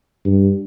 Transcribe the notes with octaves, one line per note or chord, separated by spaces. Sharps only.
G2